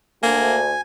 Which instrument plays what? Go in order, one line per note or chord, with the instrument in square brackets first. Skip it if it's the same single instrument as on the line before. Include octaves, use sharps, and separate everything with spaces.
[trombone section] D2 [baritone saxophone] A#3 [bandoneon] G#5